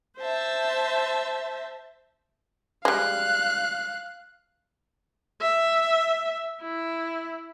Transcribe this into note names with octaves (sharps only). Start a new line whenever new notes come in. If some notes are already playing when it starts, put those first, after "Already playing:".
C5 E5 A5
G3 G#3 F5 F#6
E5
E4